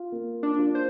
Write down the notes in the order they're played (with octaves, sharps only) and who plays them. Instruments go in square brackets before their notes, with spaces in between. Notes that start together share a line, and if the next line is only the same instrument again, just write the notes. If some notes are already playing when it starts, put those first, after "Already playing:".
Already playing: [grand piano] F4
A#3
[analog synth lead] D4
[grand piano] F4
[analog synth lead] C5